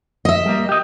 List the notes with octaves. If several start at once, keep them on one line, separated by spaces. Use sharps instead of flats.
D#5 E5
G3 A#3
G4 D#5